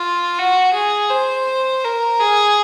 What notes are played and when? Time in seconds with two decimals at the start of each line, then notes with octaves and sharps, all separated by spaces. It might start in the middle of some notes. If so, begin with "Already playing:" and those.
Already playing: F4
0.38 F#4
0.74 G#4
1.10 C5
1.84 A#4
2.20 G#4